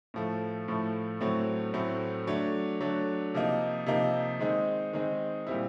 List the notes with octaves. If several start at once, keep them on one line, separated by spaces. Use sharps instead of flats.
A2 F3 A3
A2 F3 A3
A2 F#3 A3 C4
A2 F#3 A3 C4
F#3 A3 D4
F#3 A3 D4
C3 F3 A#3 D#4
C3 F3 A#3 D#4
D#3 G#3 C4 D#4
D#3 G#3 C4 D#4
A#2 G3 C4 E4